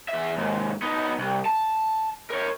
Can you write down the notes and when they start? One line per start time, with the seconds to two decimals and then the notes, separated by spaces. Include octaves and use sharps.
0.08 E2 E5
0.38 D#2 G#2
0.82 B3 D#4
1.19 C2
1.46 A5
2.30 A#4 C#5